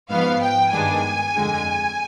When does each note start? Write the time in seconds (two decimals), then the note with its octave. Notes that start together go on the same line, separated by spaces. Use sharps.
0.10 G#2 F3 B3 F5
0.41 G5
0.72 G2 D#3 G#3 B3 D4 G#5
1.35 F2 D3 G#3